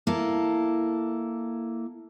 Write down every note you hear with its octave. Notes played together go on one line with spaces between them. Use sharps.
A#3 E4 A4